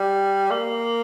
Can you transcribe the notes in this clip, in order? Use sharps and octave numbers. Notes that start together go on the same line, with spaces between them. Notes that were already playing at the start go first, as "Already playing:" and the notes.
Already playing: G3
A#3